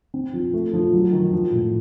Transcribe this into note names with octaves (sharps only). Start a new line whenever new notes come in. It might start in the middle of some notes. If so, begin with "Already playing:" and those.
C4
F3
A3
F3
F#3
D#3
F3
A2